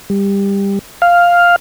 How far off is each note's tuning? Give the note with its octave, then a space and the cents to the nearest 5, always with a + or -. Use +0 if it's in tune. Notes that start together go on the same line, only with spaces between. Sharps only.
G3 +20
F5 +0